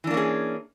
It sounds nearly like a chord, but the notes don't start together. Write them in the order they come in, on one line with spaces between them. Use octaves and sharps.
E3 D4 A#3 C#4 G#4